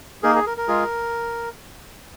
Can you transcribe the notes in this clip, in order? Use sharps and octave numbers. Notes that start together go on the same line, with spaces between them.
A#3 D#4 G#4 A#4
G#4
A#4
A#4
G#3 F4 G#4